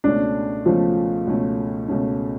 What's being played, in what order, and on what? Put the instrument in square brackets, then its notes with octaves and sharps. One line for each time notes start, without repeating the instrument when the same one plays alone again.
[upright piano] C#2 B2 A3 C#4 [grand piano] D4
[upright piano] C#2 B2 A3 C#4 [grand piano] F3
[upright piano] C#2 B2 A3 C#4
C#2 B2 A3 C#4